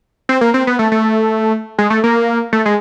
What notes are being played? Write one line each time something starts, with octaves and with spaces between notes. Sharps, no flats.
C4
A#3
C4
B3
A3
A3
G#3
A3
A#3
A3
G#3